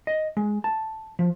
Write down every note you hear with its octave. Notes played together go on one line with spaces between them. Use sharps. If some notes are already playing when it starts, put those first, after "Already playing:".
D#5
G#3
A5
F3